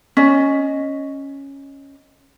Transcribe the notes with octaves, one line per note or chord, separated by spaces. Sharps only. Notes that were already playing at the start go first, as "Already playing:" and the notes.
C#4 D#5